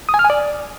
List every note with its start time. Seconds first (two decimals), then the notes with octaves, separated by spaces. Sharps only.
0.09 D#6
0.14 G#5
0.19 F6
0.24 G#5
0.30 D5